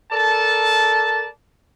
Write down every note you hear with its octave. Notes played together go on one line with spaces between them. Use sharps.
A4 A#4 D5 A5